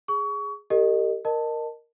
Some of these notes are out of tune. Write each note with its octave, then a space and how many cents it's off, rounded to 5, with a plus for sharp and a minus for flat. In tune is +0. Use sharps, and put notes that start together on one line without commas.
G#4 +0 C#6 +30
G4 +0 A#4 -40 D#5 -15
A#4 +0 D#5 -25 A5 +10